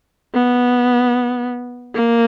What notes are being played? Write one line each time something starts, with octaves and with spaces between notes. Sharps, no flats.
B3
A#3